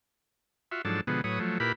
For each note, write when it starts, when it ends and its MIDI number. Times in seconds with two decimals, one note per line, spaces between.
0.72 0.82 65
0.72 0.82 66
0.72 0.82 76
0.85 1.01 44
0.85 1.01 53
0.85 1.01 54
0.85 1.01 62
0.85 1.01 69
0.85 1.01 81
1.07 1.21 47
1.07 1.21 50
1.07 1.21 53
1.07 1.21 56
1.07 1.21 59
1.24 1.39 45
1.24 1.39 54
1.24 1.39 71
1.24 1.39 73
1.24 1.39 87
1.40 1.58 53
1.40 1.58 54
1.40 1.58 57
1.60 1.72 46
1.60 1.72 64
1.60 1.72 67
1.60 1.72 70
1.60 1.72 71
1.60 1.72 83